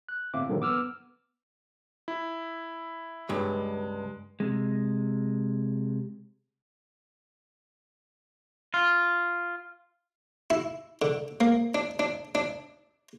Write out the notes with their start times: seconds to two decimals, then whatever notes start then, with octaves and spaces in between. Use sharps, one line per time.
0.09 F#6
0.34 G1 A2 C4 E5 F5 D6
0.49 G2 A#2 D3 D#3 F3 F#3
0.61 B3 D6 E6 F6
2.08 E4
3.29 C#2 G2 G#3
4.40 C3 G#3
8.74 F4
10.50 E4
11.02 D3
11.41 A#3
11.75 D4
11.99 D4
12.35 D4